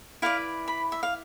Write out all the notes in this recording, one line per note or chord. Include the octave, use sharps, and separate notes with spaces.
E4 B4 D5 F5
B5
E5
F5